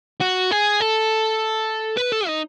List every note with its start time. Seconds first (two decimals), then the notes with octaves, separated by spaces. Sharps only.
0.21 F#4
0.51 G#4
0.80 A4
1.97 B4
2.12 A4
2.27 D#4